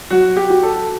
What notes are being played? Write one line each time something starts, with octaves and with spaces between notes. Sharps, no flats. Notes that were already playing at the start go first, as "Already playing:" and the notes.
F#3 F#4
G4
F#4
A4